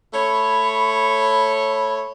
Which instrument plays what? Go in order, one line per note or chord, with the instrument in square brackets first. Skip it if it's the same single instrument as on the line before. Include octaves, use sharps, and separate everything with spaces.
[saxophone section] A3 C#5 [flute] B5